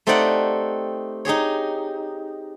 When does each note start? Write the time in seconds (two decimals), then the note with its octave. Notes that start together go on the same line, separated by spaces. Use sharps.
0.07 A3 C4 D#4 G4 D5 F#5
1.25 D#4 G4 G#4 C#5